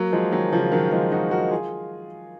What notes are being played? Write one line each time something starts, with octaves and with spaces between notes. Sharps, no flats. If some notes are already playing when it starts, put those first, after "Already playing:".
Already playing: F#3 A#3
F3 G#3
D#3 F#3
C#3 F3
D#3 F#3
F3 G#3
D#4 F#4
F#4 A#4
F4 G#4